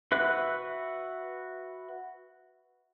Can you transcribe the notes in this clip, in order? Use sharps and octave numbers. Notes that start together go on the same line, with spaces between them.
F#4 B4 E5 F#6